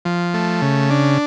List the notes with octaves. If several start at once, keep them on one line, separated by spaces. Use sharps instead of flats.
F3
A3
C#3
D4